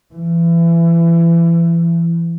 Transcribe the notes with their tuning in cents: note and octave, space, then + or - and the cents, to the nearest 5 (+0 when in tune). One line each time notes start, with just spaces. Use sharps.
E3 +30